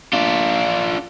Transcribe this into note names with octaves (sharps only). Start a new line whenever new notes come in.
D4 F4